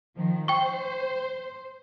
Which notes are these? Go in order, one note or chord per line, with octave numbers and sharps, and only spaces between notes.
D#3 F3
C5 G5 C#6